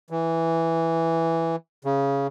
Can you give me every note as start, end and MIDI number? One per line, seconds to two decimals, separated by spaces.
0.10 1.56 52
1.85 2.27 49